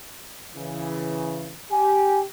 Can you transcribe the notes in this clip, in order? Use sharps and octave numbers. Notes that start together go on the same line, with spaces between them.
C#3 E3
G4 G#5